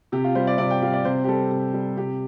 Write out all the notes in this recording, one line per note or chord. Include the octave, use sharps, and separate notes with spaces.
C3 G4
F4
G3 C5
D5
C3 D5
G5
G3 F5
D5
C3 C5
G4
G3 A4
C3
G3
C3 G4